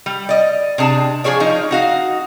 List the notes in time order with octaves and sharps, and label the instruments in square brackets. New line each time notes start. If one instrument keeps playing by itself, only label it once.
[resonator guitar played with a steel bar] G3
D5 D#5
C3 D4 G#4 A5
F3 G3 G#4 C#5 D5
F3 D#4
D#4 F#4 F5